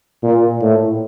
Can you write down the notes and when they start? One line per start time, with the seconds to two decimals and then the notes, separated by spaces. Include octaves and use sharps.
0.23 A#2
0.62 A2